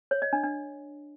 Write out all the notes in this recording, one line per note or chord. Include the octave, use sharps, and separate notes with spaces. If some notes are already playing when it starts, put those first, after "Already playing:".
C#5
D#5
D4
D4